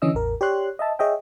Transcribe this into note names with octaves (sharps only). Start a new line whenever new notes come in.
D3 E3 C#4 D#5 E6
A1 E2 A#4
G4 C#5 D5 C6 F#6
D#5 E5 A5
G#4 C#5 D#5 E5 G5